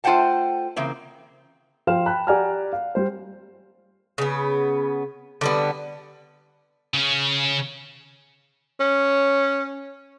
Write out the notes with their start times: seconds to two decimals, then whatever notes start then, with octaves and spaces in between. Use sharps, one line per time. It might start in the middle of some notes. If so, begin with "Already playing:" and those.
0.04 A3 F4 C5 F#5 G5 A5
0.76 C#3 E3 A#3 C4
1.87 F3 F5 G5 C6 F6 E7
2.06 G5 A5 B5 F#6
2.27 G4 D5 F#5 G#5 A#5 F6
2.73 F5
2.95 G3 C5
4.18 C#3 B3
5.41 D3 G3 B3
6.94 C#3 C#4
8.80 C#4